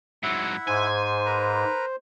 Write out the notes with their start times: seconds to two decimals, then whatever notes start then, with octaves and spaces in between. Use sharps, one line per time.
0.23 G#2 F#3 E4 E5 F#5
0.68 G#2 C5 G#5
1.26 A#4 B4 A#5